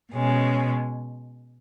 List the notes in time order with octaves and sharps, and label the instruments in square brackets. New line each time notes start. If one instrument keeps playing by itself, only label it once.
[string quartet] B2 G#3 C#4